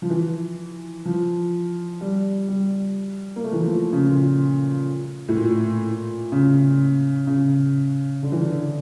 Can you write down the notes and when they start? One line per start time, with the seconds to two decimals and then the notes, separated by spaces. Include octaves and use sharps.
0.02 F3
0.10 E3
1.05 F3
2.01 G3
2.48 G3
3.36 A#3
3.44 A3
3.53 E3
3.61 F3
3.93 C#3
4.09 A#2
5.29 A2
5.35 A#2
6.32 C#3
7.27 C#3
8.23 D3
8.32 E3
8.41 D3